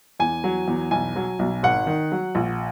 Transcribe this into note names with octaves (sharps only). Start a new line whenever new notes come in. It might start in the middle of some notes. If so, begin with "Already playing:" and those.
E2 G#5
F#3
E2
B1 G#5
F#3
B1
G#1 F#5
D#3
F#3
A#1